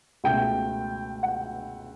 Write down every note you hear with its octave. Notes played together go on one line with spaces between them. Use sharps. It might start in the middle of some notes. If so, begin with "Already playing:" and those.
C#2 B2 A3 G5
F#5